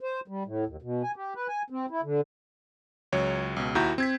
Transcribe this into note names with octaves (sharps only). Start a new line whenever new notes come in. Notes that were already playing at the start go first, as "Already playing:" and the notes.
C5
G3
A2
D#2
B2
G#5
G4
B4
G#5
C4
E4
D3
C#2 F#3 C#5
C#2 B2
D#2 E4 F#4 A#5 G6
C4 G#6 B6